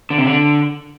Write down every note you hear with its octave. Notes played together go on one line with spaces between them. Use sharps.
D3
C3
D3